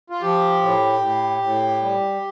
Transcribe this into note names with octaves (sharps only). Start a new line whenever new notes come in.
F4
F3 G4
A2
A2
A2
G3